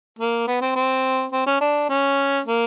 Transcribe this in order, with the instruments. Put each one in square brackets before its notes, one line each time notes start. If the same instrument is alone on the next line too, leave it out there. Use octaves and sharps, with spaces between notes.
[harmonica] A#3
B3
C4
C4
C4
C#4
D4
C#4
A#3